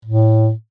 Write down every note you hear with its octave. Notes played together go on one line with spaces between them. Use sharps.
A2